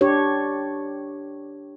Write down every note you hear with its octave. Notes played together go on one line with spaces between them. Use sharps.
D4 G4 C#5